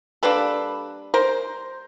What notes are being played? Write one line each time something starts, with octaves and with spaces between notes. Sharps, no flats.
G3 A#3 D4 A4 B4
A#4 C5